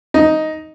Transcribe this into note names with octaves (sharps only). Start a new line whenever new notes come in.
D#4